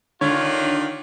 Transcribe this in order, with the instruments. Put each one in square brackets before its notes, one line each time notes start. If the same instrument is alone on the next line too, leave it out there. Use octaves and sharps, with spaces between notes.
[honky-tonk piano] D3 [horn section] D#3 D4 F4 [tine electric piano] C#5